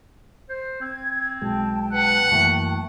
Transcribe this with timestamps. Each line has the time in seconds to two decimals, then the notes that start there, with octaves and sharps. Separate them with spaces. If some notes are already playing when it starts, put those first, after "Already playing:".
0.49 C5
0.81 C4 G#6
1.42 B1 B2 G#3 G5 A5
1.93 B4 F#5
2.31 F#2 E3 A3 A#3